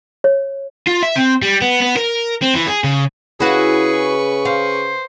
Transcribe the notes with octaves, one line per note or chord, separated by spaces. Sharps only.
C#5
F4
E5
C4
G3
B3
B3
A#4
C4
E3
G#4
C#3
C#3 E4 F#4 G#4 B4 F5 C#6
C5 F5